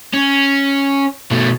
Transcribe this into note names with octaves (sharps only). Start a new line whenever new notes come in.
C#4
B2 A3